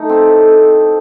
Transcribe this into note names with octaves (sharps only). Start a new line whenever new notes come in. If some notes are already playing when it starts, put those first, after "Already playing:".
Already playing: A3 D#4
C4
A2